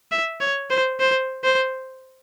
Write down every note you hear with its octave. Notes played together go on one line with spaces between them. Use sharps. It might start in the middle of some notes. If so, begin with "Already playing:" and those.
E5
C#5
C5
C5
C5